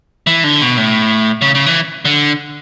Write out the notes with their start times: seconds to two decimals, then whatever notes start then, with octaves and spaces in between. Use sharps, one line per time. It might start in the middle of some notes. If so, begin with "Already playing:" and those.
0.27 E3
0.44 D3
0.61 B2
0.78 A2
1.42 C#3
1.55 C#3
1.66 E3
2.05 D3